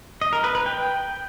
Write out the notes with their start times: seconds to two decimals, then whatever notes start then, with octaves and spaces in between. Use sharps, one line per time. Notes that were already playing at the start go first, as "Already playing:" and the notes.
0.21 D#5
0.33 A#4
0.44 B4
0.55 B4
0.66 G5